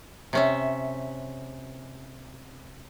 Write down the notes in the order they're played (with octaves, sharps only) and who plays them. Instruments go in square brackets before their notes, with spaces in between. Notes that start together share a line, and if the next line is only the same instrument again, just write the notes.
[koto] C3 C#4 E5